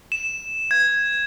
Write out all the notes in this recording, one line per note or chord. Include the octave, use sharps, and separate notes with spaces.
E7
G#6